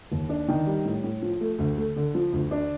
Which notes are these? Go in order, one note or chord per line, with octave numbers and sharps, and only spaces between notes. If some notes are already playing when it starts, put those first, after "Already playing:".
D#2
D4
D#3
G3
A2
A2
F3
A3
D2
A3
D3
F3
D2
D4